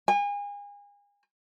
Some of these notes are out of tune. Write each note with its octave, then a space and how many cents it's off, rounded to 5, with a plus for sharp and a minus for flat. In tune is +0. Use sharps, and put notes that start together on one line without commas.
G#5 -35